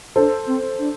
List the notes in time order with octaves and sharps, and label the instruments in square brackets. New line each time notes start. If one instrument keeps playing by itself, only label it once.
[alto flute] D4 [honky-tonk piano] A4 C5
[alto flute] C4
D4